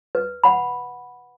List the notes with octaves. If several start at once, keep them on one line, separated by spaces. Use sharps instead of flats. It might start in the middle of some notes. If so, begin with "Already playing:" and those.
B4
F#5 B5